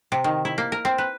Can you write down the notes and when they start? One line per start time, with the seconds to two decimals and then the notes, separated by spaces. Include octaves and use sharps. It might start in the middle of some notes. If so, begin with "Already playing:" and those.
0.12 C3
0.24 D#3
0.45 E4
0.58 A#3
0.72 A#4
0.85 C4
0.98 B4